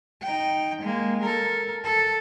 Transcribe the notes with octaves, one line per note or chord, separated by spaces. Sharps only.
D#4 G5
G#3 A#3
A4 A#4
A4